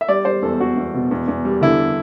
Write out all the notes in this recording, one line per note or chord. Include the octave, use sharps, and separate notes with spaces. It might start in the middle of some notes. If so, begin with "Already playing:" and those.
E5
G3 D5
G3 C5
E2 A4
E2 F#4
E2
B2
E2
E2
G3
D3 E4